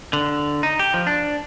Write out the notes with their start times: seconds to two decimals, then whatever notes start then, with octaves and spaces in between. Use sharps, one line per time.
0.13 D3
0.63 D#4
0.79 G4
0.94 F3
1.07 D4